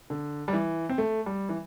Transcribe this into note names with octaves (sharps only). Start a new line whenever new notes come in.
D3
G3
E3
C4
A3
G3
E3